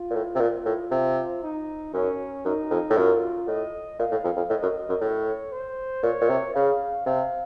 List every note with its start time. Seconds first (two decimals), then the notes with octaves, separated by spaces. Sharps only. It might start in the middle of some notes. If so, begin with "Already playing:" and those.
Already playing: F4
0.11 A#2
0.14 A2
0.35 C3
0.40 A#2
0.66 A2
0.91 C3
1.43 D#4
1.93 F#2 C#4
2.45 F#2 D#4
2.71 F2
2.90 A2
2.96 F#2 F4
3.47 A2 D#5
3.99 A#2 F5
4.12 A2
4.24 F2
4.37 F2
4.50 A2 D#5
4.62 F#2
4.89 F#2
5.01 A2 C#5
5.52 C5
6.03 A#2 C#5
6.21 A#2
6.29 C3
6.54 C#3 F5
7.06 C3 F5